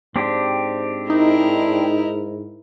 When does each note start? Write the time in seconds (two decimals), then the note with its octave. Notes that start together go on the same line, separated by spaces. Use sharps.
0.16 G#2 C4 D4 G4
1.10 D#4 E4 A#4